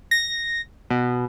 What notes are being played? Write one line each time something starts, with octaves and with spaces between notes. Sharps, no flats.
A#6
B2